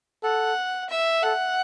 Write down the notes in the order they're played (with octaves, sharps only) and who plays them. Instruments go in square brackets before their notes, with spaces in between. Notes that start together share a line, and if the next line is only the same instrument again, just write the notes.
[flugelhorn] A4 [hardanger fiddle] F#5
[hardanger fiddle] E5
[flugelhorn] A4 [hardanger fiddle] F#5